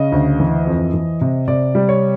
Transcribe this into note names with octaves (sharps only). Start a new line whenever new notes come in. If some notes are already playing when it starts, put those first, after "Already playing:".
Already playing: C#3 D#5
D2
E3
F2
E3
C3
C3 D5
G3
C#5